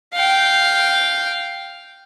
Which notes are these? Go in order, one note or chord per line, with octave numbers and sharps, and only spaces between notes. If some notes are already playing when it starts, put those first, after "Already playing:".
F5 G5